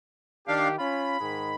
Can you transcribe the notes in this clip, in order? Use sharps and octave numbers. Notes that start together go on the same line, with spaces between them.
D#3 D4 G4 F5
C#4 F4 B5
G#2 D#3 G#3